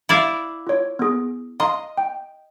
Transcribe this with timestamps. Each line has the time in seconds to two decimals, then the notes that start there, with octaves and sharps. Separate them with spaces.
0.09 E4 D5 F5
0.67 F4 C#5
0.99 B3 G#4
1.60 D#5 F5 A#5 C6
1.97 G5